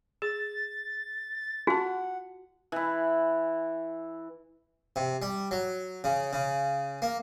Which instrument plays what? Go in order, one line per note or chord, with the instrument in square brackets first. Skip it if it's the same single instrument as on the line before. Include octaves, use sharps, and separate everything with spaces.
[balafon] G#4 [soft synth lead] A6
[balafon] F4 A5 [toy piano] F#4 [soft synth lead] F#5
[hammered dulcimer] E3 E4
[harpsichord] C3
G3
F#3
C#3
C#3
A#3